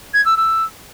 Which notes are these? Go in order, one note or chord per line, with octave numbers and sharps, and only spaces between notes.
G#6
E6
E6